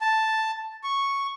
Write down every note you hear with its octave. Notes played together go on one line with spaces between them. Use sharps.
A5
C#6